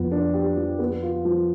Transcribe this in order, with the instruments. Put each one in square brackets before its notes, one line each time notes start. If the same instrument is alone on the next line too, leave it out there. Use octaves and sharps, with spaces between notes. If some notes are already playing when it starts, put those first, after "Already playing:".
Already playing: [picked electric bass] F2 [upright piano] F3 B3
[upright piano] D4
G4
F3
B3
F4
F3